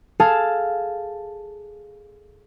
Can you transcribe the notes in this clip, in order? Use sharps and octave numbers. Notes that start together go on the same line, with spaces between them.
G#4 A4 F5 A5